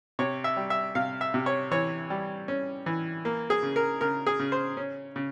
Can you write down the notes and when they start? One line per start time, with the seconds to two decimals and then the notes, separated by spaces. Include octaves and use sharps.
0.19 C3 C#5
0.44 E5
0.57 G3
0.70 E5
0.95 C3 F5
1.21 E5
1.34 C3
1.46 C#5
1.72 E3 C#5
2.10 G3
2.48 C#4
2.86 E3
3.25 A#3
3.50 G#4
3.63 C#3
3.76 A#4
4.01 C#3 A#4
4.27 G#4
4.39 C#3
4.52 C5
4.77 C#4
5.16 C#3